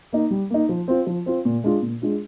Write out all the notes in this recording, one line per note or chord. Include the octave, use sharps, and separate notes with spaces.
A#3 D#4
G3
A#3 D#4
F3
C4 F4
F3
C4 F4
A#2
G#3 D4 F4
A#2
G#3 D4 F4